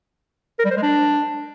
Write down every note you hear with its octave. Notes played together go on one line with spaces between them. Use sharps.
A#4
G3
C5
G#3
D4